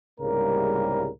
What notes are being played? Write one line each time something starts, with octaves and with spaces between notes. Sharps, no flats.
C2 G#2 C#3 G3 A#3 A#4